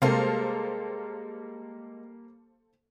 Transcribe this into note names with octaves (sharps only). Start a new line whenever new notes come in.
C3 G3 G#3 A#3 A4 A#4 C5 F5